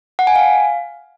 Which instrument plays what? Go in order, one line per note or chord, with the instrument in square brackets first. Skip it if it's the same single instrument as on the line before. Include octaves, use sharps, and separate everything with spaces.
[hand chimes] F#5
G#5
F5